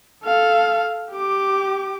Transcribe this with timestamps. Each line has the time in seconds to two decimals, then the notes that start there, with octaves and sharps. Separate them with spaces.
0.24 A4 F5
1.12 G4 D6